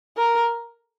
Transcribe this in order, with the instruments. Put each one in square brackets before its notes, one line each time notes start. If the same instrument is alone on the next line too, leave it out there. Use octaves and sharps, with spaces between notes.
[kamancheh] A#4